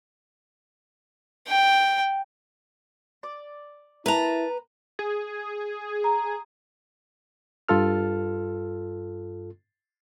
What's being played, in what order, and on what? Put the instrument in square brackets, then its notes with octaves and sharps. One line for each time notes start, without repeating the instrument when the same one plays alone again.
[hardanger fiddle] G5
[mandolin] D5
[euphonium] E4 [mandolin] A#4 A5 [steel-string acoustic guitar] B4 A#5
[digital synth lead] G#4
[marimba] A#5
[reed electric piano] G2 F4 A4 F6